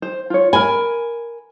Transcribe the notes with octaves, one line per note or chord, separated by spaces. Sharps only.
C5
F4 C#5
A#4 G#5 B5